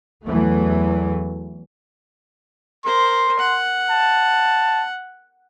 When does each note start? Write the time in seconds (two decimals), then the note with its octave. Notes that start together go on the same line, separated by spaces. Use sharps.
0.25 E2 E3 F#3 A3
2.85 A#4 C5 C6
3.39 F#5
3.91 A5